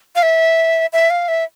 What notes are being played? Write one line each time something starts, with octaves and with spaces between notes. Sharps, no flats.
F5
E5
E5
F5
E5